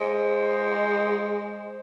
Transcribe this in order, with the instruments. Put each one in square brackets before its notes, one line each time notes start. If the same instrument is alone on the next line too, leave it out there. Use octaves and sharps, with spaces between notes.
[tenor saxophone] G#3 [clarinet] C5